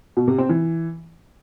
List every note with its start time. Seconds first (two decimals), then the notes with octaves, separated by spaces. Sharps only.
0.17 B2
0.28 C3
0.38 C4
0.49 E3